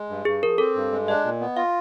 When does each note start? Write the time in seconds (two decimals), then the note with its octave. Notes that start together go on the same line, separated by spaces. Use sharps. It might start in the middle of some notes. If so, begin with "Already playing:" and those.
Already playing: G#3
0.09 G2
0.25 G2 G#4
0.42 F3 A#4
0.58 C4 A4
0.76 G2
0.92 G#3
1.08 D4 D#5
1.24 A#2
1.40 B3
1.57 F4 F5